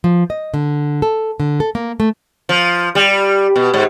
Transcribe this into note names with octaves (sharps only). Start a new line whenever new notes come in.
F3
D#5
D3
A4
D3
A4
A#3
A3
F3
G3
B2
G#2